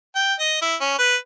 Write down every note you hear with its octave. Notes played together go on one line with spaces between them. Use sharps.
G5
D#5
E4
C#4
B4